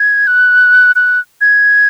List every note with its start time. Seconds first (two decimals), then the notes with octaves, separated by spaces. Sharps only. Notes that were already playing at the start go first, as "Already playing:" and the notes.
Already playing: G#6
0.27 F#6
0.96 F#6
1.41 G#6